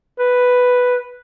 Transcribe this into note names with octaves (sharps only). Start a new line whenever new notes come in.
B4